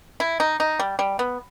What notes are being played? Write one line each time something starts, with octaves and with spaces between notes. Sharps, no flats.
E4
D#4
D#4
G3
G3
B3